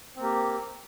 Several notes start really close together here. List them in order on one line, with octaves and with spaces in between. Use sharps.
C4 A#3 G4